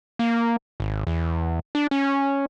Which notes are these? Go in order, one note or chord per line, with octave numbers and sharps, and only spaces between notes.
A#3
G#1
E2
D4
C#4